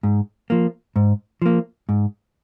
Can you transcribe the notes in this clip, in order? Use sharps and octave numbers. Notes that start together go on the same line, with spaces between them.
G#2
F3 A#3
G#2
F3 A#3
G#2